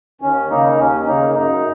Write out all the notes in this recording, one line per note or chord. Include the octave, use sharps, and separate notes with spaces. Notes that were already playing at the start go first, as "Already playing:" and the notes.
D#2 C#4
C#3 A#3 D#4
D#2 C#4
C#3 A#3 D#4
F#2 D#4